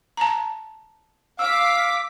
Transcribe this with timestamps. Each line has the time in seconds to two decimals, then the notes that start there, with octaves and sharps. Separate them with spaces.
0.17 A5 A#5
1.39 F5 D6 E6 B6